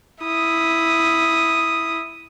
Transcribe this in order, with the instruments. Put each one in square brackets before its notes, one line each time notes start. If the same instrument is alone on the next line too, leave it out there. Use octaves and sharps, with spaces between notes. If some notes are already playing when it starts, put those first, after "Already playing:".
[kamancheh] E4 D#6